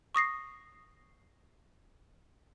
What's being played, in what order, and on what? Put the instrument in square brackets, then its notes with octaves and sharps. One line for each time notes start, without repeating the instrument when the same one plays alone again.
[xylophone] C#6 D#6 A#6 C7